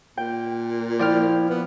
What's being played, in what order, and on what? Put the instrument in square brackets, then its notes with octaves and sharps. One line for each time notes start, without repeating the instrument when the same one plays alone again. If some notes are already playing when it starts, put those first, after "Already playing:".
[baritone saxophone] A#2 [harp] G5
[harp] F3 [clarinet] E4 [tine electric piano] D5 G5 F6
[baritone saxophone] B3 [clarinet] B4